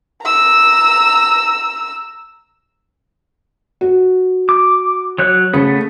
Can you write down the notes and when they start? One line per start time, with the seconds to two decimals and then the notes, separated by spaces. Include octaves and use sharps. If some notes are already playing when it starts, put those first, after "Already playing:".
0.23 A#5 E6
3.81 F#4
4.49 D6
5.18 F#3 C#5 F#6
5.54 C#3 A3 B3